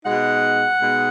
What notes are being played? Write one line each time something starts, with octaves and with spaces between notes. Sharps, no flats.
B2 G#3 D#4 F#5
B2 G#3 D#4